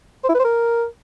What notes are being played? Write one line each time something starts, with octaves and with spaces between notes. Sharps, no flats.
C5
E4
B4
C5
A#4